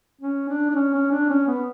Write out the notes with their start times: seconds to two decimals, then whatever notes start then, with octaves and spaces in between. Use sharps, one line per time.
0.21 C#4
0.49 D4
0.70 D4
0.75 C#4
0.94 C#4
1.11 D4
1.30 C#4
1.47 B3